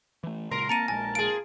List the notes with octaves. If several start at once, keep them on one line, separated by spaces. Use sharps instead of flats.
E3 A3
A#2 C#3 G#3 A#4 C6
A#3 C4 A5 A#5 C#7 D#7
A#1 A#2 G#3 G#5 A5
F4 G#4 D7